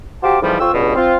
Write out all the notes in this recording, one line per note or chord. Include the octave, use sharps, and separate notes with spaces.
F#4 G4 C5 F5 A5 D6
F2 G#2 C3 E3 F3 G3
F2 F4 G5 C#6 E6
C#2 G2 B2
C4 F4